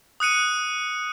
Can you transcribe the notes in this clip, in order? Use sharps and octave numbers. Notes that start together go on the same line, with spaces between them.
D#6 F#6 C#7 D#7